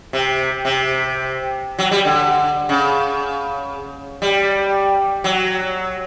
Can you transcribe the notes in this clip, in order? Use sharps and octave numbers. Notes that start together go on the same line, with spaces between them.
C3
C3
F#3
G3
D3
C#3
G3
F#3